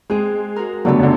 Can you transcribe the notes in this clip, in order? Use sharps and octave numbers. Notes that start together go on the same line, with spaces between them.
G#3 C4 G#4
F#4 A#4
G2 D3 F#3 A3 B3
F#2 D3